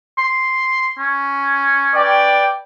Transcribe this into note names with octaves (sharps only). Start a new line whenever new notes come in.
C6
C#4
B4 D5 G5